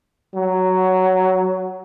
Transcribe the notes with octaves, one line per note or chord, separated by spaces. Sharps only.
F#3